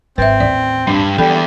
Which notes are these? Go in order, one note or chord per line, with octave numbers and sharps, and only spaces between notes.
G#1 C4 B4 E5
A1 D#2 D5
G2 D4
E2 D3 G3 A4 G5 B5